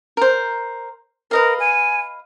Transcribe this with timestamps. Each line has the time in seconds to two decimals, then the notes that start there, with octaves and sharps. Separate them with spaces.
0.17 A#4 C5
1.31 A#4 B4 D#5 F5
1.60 G#5